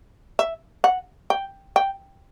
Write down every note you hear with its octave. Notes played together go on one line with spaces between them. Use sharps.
E5
F#5
G5
G5